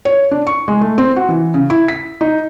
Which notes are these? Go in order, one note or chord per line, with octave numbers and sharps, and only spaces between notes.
C#5
D4
C#6
G#3
A3
C4
F#4
E3
C#3
E4
B6
D#4